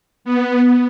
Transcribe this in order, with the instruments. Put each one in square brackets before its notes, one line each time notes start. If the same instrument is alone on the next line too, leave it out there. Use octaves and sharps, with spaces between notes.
[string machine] B3